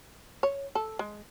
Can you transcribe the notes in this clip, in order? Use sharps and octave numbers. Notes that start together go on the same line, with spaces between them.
C#5
A4
G#3